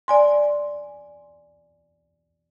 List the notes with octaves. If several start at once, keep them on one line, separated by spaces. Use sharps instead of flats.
D5 G#5 C6